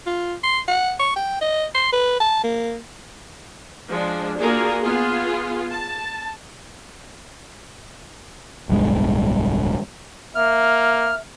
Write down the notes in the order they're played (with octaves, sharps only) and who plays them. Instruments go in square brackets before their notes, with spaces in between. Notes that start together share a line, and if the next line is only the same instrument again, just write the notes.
[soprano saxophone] F4
C6
F#5
C#6
G5
D#5
C6
B4
A5
A#3
[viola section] F3 G#3 D4
A#3 D4 F4 F#4 G#4 A#4
B3 F4 G#4
A5
[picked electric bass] D1 B1 G2 G#3
[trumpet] A#3 [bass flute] E5 [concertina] F6